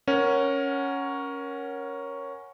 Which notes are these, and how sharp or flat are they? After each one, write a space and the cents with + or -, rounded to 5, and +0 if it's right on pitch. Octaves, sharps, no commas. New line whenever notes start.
C#4 +0 A#4 +15 F#5 +0